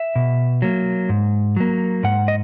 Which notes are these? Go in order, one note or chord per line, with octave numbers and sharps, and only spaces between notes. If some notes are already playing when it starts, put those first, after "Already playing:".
Already playing: E5
B2
F#3 A#3
G#2
F#3 A#3
G#2 F#5
D#5